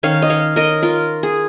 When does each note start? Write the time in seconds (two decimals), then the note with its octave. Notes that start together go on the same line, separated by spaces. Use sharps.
0.03 D#3 C#4 C#5 F5
0.22 D#5
0.30 C#5 F5
0.56 A#4 D#5
0.82 F4 A#4
1.23 G#4